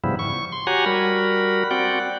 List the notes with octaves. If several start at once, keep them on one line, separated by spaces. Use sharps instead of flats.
G#2 C#3 F3 G3 B3 E4
C#6
C6
F#4 G4 C#5 F#5 G#5 A#5
G3 F#4 A#4 B5
C4 F#4 D5 F#5 G5